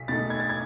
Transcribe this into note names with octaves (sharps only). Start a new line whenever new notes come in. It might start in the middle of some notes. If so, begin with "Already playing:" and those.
Already playing: B1 B6
B2 A3 D#4 A6
G#6
A6
G#6